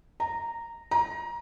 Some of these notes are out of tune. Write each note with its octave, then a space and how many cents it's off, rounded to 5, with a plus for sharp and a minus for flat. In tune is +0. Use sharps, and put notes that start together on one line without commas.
A#5 -10
A#5 +20